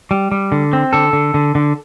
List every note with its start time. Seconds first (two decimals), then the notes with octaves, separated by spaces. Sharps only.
0.11 G3
0.32 G3
0.52 D3
0.73 C4
0.93 D3 A4
1.13 D3
1.34 D3
1.55 D3